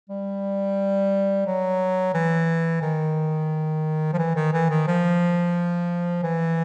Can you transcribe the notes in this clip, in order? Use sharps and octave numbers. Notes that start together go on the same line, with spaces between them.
G3
F#3
E3
D#3
F3
E3
D#3
E3
D#3
F3
E3